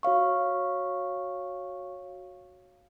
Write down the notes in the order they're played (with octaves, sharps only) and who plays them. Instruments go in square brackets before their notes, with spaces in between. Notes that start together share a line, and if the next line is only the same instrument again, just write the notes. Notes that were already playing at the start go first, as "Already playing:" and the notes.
[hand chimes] F#4 C#5 F5 C#6